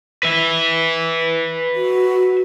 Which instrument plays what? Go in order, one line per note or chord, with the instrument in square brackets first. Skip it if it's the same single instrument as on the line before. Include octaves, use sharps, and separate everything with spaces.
[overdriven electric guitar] B4 E5
[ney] F#4